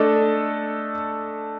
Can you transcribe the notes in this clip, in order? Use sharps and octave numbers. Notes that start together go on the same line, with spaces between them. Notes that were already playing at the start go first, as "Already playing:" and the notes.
Already playing: A3 D4 A4 D#5